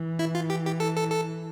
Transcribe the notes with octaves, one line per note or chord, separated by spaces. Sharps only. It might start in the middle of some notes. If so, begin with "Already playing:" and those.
Already playing: E3
E4
F4
G4
G4
A4
A4
A4